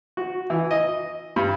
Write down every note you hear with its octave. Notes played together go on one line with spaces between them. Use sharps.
F#4
E3
D#5
G2